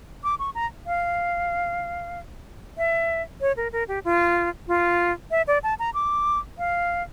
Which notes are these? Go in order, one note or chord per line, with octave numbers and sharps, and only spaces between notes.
D6
C#6
A#5
F5
E5
C#5
A#4
A#4
G4
F4
F4
E5
D5
A5
A#5
D6
F5